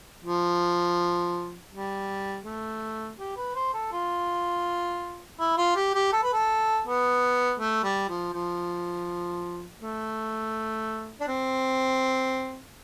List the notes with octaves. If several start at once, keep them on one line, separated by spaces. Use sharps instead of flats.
F3
G3
A3
G4
B4
C5
A4
F4
E4
F4
G4
G4
A4
B4
A4
B3
A3
G3
F3
F3
A3
D4
C4